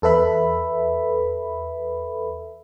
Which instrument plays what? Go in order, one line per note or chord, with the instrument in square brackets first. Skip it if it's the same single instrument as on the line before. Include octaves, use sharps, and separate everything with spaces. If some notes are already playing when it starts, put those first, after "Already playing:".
[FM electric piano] E2 A4 B4 E5 B5